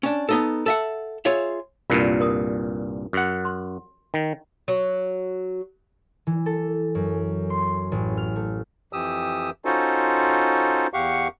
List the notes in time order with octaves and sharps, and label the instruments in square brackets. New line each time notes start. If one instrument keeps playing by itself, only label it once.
[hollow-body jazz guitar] C#4 D4
B3 D#4 A4
A4 E5 F#5
F4 G#4 C#5 E5
[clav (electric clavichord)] C2 G2 A#2 [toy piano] F4 A#4 D5
[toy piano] A#4 D#6
[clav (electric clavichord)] F#2 F#5
[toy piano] C6
[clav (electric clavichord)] D#3
[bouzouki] F#3
[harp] E3
A4
F#2
C6
A1
F6
A3
[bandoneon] F2 E3 G4 D#6 E6
C#4 D#4 F4 F#4 A4 C5
E2 G4 F5 F#5 C#6